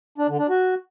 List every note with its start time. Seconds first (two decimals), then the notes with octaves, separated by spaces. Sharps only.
0.18 D4
0.28 D3
0.39 D4
0.49 F#4